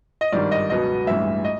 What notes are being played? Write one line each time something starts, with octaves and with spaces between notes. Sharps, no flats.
D#5
G#1 G2 D#3 G3 D5
D#5
C#2 B2 F#3 B3 D#5
A1 G2 E3 G#3 E5
D#5